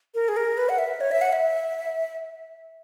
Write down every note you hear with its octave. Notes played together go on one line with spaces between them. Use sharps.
A#4
G#4
A#4
B4
F#5
E5
C#5
E5
F#5
E5